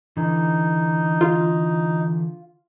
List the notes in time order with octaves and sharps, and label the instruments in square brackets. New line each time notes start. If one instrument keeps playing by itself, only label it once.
[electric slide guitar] D3 E3 [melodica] D#4
[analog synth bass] F4